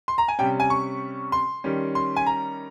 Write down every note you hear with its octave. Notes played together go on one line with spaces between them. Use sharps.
C6
A#5
G#5
C3 G3 C#4 G5
G#5
C#6
C6
D#3 G3 C#4
C6
G#5
A#5